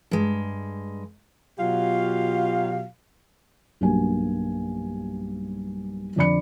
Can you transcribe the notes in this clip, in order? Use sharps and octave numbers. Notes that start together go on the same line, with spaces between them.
G2 G#3
B2 F#3 F4 G4 F5
B1 G2 G3 A#3 G#5
F2 D3 D4 D5 B5 C#7